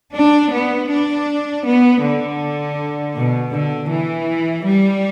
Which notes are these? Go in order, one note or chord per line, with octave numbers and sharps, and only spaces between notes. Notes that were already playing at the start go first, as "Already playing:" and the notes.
D4
B3
D4
B3
D3
B2
D3
E3
G3